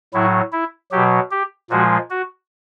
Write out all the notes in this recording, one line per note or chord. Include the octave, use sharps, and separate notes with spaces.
A2 F#3 E4
E4
B2 F#3 G4
G4
A#2 F3 G#3 F#4
F#4